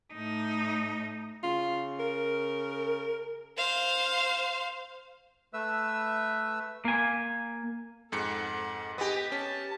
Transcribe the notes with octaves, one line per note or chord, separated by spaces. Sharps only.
A2 D#4
C#3 F4
A#4
C5 F5
A3 B4 E5 E6
A#3 G#5
F2 G#2 A4 F#5 C#7
B3 G4 D#5
C#4 A5